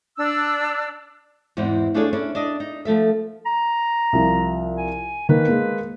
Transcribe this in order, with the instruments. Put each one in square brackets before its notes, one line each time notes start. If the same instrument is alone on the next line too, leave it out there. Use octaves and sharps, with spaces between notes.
[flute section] D4 E6
[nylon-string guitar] E2 G#2 E3 B3 C4
A3 D4 F4 G#4 A4 C#5
C#4 D4 E4
D4 D5 D#5
D#4
F3 A3 A4 E5
[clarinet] A#5
[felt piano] C2 F3
[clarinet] G#5
[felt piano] D#3 A#3 [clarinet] B4
[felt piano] G#3 A#3